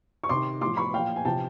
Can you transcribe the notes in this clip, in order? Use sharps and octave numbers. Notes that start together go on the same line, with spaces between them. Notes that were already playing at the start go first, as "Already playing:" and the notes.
C#6
C3 D#3 C6 D6
A2 F3 C6 D6
B5 C#6
A#2 F3 F5 G5
G#5
C3 F3 G5 A5